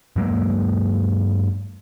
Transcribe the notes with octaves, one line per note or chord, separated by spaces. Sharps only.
G2 F#3 G#3 A#3